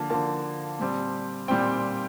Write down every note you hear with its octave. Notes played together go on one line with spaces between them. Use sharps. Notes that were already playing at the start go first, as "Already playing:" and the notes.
Already playing: D3 F3 A#3 A5
D3 F3 A#3 A5
A#2 G3 C4
A#2 G3 C4 G5